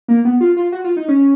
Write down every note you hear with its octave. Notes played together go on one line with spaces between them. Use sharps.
A#3
B3
F4
F4
F#4
F4
D#4
C#4